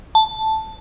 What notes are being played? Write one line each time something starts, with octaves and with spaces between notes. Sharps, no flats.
A5